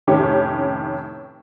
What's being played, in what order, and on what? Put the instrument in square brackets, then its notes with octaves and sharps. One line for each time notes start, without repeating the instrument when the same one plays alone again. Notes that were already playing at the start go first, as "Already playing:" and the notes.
[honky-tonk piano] F1 A2 D#3 C#4 G4